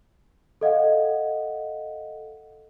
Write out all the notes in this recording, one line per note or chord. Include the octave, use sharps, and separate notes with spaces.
A4 D#5 F5 F#5